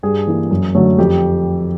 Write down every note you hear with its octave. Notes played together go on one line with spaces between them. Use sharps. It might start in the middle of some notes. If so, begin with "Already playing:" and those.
G2 G#4
E3 G3 A#3
F#2
D3 F#3 A3 C#4
F2 G4